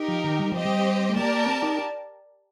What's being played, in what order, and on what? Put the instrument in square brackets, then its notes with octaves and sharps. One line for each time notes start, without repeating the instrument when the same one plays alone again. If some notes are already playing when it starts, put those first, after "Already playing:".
Already playing: [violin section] D#4 G4 A#4
[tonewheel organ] F3
D#3
G3
[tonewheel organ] F3 [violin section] C4 G4 C5 D#5
[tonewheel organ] G3
A3
[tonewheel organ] A#3 [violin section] G4 A#4 D5 A5
[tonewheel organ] C4
D#4